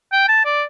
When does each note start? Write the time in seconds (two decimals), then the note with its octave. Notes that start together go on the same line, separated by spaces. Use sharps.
0.12 G5
0.28 A5
0.45 D5